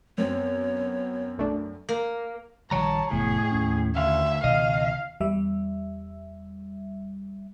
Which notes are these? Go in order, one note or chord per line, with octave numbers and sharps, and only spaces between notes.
F#2 B3 C4 C#5
B1 A3 D4
A#3
A#1 D#3 G3 C#5 A5 A#5
F1 E2 A2 G#4
D#2 C#4
D2 E5 F5
C#2 B2 D#3 D#5 F5
E2 G3 E5